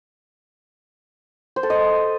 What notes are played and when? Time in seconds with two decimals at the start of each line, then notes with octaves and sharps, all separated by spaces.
1.56 C5
1.63 A4
1.70 D#5